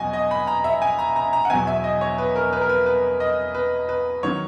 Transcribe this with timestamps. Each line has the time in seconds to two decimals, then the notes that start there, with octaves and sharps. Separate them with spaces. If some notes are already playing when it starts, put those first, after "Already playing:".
Already playing: E2 B2 F#3 D#5 G#5
0.13 D#5
0.31 B5
0.47 A#5
0.64 E5
0.82 G#5
0.99 A#5
1.16 A#5
1.33 A#5
1.45 F#5
1.50 E2 B2 F#3 G#5
1.67 E5
1.84 D#5
2.01 C#5
2.18 B4
2.35 A#4
2.53 B4
2.61 A#4
2.69 B4
2.86 B4
3.20 D#5
3.55 B4
3.89 B4
4.23 D#3 F#3 C#5